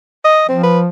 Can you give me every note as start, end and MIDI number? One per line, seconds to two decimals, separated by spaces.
0.25 0.45 75
0.49 0.89 53
0.49 0.58 60
0.63 0.79 71